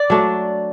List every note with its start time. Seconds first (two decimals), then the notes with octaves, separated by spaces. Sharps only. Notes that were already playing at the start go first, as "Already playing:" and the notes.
Already playing: D5
0.10 F#3 A3 D4